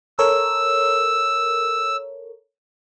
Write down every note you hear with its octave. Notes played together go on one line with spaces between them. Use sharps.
A4 A#4 C#5 E6